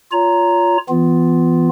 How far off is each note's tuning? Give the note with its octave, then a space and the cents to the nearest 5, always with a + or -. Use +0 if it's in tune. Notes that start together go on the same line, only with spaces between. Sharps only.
F4 +0 C#5 +30 A#5 +0
E3 +15 B3 +20 F4 +0